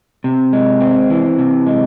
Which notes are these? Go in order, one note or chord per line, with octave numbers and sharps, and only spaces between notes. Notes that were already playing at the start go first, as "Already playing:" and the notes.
C3
G#3
C4
E3
C3
G#3